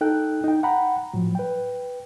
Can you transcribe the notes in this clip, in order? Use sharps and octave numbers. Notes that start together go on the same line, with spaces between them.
D#4 A4 G5 F#6
D#4 G5
F#5 G5 A#5 B5
A2 F3 F#3
B4 G5